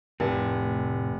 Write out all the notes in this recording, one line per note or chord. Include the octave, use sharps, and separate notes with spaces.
F1 A2 C3 E4